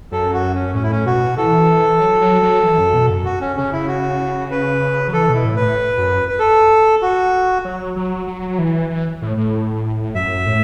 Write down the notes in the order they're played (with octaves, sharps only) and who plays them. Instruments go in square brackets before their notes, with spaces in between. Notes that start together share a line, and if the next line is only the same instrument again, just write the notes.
[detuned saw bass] F#2 [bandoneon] A4
[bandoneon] F#4
C#4
[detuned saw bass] A2 [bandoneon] C#4
[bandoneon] E4
C#4
[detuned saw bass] B2 [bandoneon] F#4
[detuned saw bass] E3 [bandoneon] A4
[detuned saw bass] F#3
F#3
F#3
E3
F#2
B2
F#2
[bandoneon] F#4
C#4
[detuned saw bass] C#3 [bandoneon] C#4
[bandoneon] E4
F#4
B4
[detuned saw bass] F#3
[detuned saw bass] E3 [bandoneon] A4
[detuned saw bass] B2
[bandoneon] E4
[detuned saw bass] A2
[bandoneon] B4
[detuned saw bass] A2
F#2
[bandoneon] B4
A4
F#4
[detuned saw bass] F#3
F#3
F#3
E3
E3
A2
A2
[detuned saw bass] F#2 [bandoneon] E5
[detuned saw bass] A2